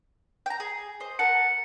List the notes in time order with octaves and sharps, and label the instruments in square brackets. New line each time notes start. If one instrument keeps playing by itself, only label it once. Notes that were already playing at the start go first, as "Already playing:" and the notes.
[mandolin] G5 A#5
G#4
C5 D#5
[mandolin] A#4 F#5 A5 [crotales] C#7